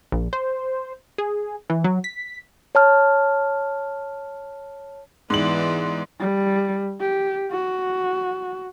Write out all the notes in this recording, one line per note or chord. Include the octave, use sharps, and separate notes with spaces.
A#1
C5
G#4
E3
F#3
B6
C#5 A5 F6
G#2 E3 B3 D5 F#7
G3
G4
F#4